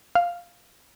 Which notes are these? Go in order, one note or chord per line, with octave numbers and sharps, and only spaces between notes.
F5